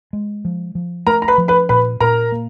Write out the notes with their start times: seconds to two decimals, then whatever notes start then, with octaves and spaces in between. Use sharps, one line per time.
0.13 G#3
0.45 F3
0.75 F3
1.07 A3 A#4 A#5
1.22 A#5
1.28 B4 B5
1.38 F3
1.48 B4 B5
1.69 A#2 B4 B5
2.00 A#2 A#4 A#5
2.32 A#3